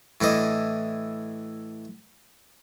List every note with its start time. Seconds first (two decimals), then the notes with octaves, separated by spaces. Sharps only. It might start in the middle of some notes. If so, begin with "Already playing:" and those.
0.21 A2 E3 D4 D#5